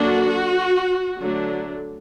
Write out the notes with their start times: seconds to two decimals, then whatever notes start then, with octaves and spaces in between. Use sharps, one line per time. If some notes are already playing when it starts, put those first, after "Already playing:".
Already playing: D3 F#3 A#3 D4 F#4
1.21 D3 F#3 A3 D4